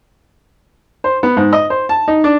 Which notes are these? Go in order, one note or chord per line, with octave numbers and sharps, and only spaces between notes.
C5
B3
G#2
D#5
C5
A5
D#4
D4